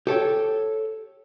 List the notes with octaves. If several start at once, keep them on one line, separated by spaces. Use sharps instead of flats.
G4 A4 C#5 G5